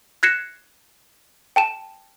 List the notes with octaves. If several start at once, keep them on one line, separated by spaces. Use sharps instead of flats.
F#6 G#6 A#6 C7 C#7 E7
G5 A5 E7